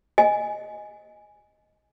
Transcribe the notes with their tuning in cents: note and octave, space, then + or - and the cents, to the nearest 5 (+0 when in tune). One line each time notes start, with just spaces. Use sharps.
D#5 +0 G#5 +0